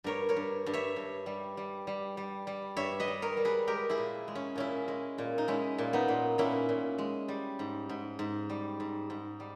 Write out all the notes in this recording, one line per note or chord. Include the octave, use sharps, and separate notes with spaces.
G2 A#4 C#5
A#4 C#5
G2
G2
C#5 E5
G2
G3
G3
G3
G3
G3
G2 C#5 E5
B4 D#5
G3
A#4 C#5
G3
G#4 B4
G#3 G4 A#4
E4 G#4
A#2
G#3
C#4
A#2 C#4 E4
G#3
A#2
D#4
G#3 C#4 E4
A#2
B3 D#4
A#2
A#2 C#4 E4
A#2
G#3
G3
G#2
G#2
G#2
G3
G#2
G#2
G3